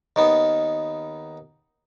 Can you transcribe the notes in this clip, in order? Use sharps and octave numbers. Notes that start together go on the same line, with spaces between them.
D#2 D#3 B3